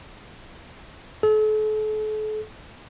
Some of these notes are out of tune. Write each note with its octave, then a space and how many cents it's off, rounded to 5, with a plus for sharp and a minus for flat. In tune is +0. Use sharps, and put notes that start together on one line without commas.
A4 -40